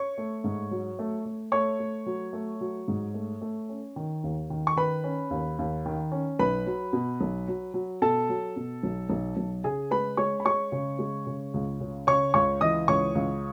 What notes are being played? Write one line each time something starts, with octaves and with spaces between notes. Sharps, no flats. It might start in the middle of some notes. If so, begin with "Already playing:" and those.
Already playing: C#5 C#6
A3
G#2
F#3
A3
A3
A3 C#5 C#6
A3
F#3
A3
F#3
G#2
A3
A3
C#4
D#3
D#2
D#3
C#6
D#3 B4 B5
C#4
D#2
D#2
D#3
C#4
B1 B4 B5
F#3
B2
B1
F#3
F#3
B2 A4 A5
F#3
B2
B1
B1
B1
C#3 G#4 G#5
G#3 B4 B5
G#3 C#5 C#6
B5
G#3 C#5 C#6
C#3
G#3
C#3
C#2
C#3
C#3 C#5 C#6
C#2 C#5 C#6
E3 D#5 D#6
C#2 C#5 C#6
C#2